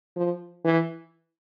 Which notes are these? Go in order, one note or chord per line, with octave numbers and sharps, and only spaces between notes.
F3
E3